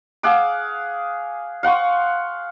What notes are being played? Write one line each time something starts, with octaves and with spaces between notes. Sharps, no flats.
G#4 F5 F#5 D6
F5 F#5 C6 C#6